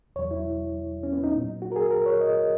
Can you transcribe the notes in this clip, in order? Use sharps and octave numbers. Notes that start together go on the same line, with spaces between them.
E2 B2 F#3 C#5
E4
C#4
B3
D#4
A#2 F#3
F#4
A#4
G#4
A#4
C#5
D#5